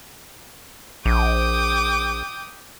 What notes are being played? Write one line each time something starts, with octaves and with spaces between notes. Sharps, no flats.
A#1 G5 D6 D#6